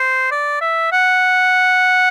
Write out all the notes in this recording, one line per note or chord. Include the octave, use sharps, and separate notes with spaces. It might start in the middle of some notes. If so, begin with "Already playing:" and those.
Already playing: C5
D5
E5
F#5